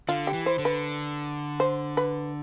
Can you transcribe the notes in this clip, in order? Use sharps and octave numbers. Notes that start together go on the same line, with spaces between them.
D3 F4
G4
E3
C5
D3
B4
C5
B4